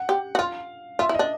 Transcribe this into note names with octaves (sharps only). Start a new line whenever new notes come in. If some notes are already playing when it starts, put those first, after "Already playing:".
Already playing: F#5
G4
F#4
F4 F5
F4 E5
E4
D#5
D4